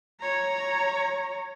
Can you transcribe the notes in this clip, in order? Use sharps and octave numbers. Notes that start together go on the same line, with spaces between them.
C#5 A#5